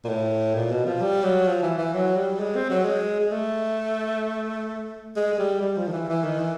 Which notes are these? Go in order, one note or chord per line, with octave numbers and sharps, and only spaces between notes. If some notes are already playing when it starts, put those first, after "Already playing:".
A#2
A2
A#2
B2
F3
G3
F#3
F3
E3
E3
F#3
G3
G#3
C4
F#3
G#3
G#3
A3
G#3
G#3
G3
G3
F3
D#3
E3
E3
D#3
E3